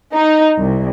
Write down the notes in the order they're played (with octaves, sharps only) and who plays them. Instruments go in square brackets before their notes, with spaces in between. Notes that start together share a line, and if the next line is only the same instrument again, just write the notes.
[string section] D#4
C2